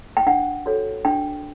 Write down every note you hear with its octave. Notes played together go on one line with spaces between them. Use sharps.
G5
D4 F#5
F#4 A4 C#5
D4 G5